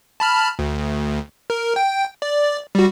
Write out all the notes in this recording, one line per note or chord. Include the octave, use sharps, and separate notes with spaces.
A5 B5 F6
D2
A#4
G5
D5
G3 F#4